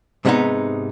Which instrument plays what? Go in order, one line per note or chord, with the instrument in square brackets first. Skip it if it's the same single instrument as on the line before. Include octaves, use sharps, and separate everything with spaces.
[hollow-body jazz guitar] G#2 C3 G#3 A3 B3 D#4